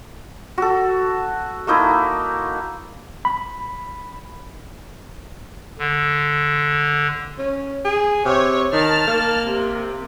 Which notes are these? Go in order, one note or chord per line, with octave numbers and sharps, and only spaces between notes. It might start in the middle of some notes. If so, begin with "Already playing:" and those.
F#4 A4
A3 A#3 D#4 E4
B5
D3
C#4
G#4
C3 C#5
D#3 A5 F6
A#3
C3